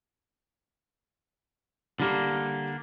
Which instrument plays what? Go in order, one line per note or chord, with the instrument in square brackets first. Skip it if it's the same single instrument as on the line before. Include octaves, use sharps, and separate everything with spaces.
[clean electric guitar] D3 A#3 [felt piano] G3